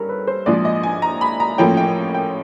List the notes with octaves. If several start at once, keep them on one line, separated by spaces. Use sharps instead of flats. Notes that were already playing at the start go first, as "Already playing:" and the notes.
Already playing: G2 C#4 A4 A#4
B4
C5
A#1 G#2 F3 D5
D#5
G#5
A#5
B5
A#5
A1 A2 F3 A#3 C#4 G5
G5
G5